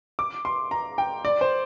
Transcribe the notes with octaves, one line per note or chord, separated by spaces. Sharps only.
D6
C6
A#5
G5
D5
C5